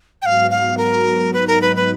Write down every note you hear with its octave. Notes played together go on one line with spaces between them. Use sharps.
G#2 F#3 B3 F#4 F5 G5
F5
A#4
G#2 F#3 B3 D#4 B4
A#4
B4
B4